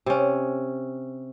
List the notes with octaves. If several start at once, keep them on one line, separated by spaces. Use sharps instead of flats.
C3 C#4